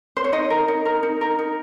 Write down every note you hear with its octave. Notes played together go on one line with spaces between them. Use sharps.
C5
C#5
D#4 D#5
A#4
D#4
A#4
D#4
A#4
D#4